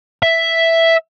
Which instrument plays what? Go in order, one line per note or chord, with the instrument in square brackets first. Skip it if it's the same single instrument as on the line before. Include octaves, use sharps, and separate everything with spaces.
[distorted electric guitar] E5